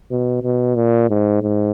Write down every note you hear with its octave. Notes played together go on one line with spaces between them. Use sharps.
B2
B2
A#2
G#2
G#2